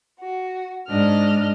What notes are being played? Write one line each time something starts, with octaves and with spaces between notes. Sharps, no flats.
F#4
G#2 D4 D#5 F6